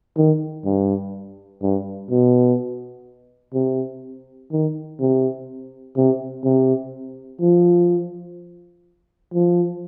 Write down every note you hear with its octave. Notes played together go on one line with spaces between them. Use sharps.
D#3
G2
G2
B2
C3
D#3
C3
C3
C3
F3
F3